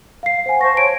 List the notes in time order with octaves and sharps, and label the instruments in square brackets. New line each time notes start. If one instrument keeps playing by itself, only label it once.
[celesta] F5 C7
C5 F#5 G#5
[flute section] C5 A5 C#6 [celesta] A#6
[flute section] C#5 [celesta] D7